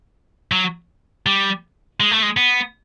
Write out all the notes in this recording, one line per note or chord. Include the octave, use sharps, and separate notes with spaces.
F#3
G3
G#3
A3
G#3
B3